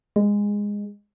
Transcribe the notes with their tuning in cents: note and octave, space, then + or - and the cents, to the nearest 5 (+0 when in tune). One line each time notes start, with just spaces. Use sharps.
G#3 -15